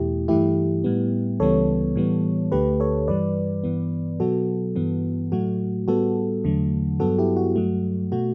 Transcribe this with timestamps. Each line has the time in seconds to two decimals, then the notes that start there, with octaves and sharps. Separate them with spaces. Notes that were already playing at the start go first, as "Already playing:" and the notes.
Already playing: E2 B2 A3 E4 G4
0.28 G2 E3 A3 E4 G4
0.84 A2 G3 B3
1.40 C#2 C#3 E3 G3 B3 A4 C#5
1.96 A2 E3 G3 B3
2.52 D2 D3 A3 G4 B4
2.80 A4 C#5
3.08 G2 E3 G3 B4 D5
3.64 G2 E3 B3
4.20 B2 F#3 B3 F#4 A4
4.76 G2 E3 B3
5.32 A2 F#3 A3 F#4
5.88 A2 G3 B3 F#4 A4
6.44 E2 D3 F#3 A3
7.00 G2 F#3 B3 F#4 A4
7.18 E4 G4
7.37 F#4
7.56 G2 F#3 A3
8.12 B2 A3 F#4